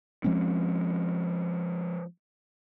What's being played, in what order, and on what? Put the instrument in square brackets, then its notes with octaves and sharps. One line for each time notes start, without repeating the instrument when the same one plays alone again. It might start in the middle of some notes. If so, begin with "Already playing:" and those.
[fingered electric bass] F3 G#3 C4 C#4